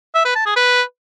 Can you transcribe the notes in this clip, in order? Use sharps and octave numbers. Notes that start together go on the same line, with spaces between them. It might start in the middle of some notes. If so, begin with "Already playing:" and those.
E5
B4
A5
G#4
B4